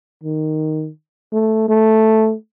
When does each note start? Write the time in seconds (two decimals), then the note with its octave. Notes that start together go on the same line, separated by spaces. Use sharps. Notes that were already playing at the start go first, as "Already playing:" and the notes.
0.23 D#3
1.32 A3
1.68 A3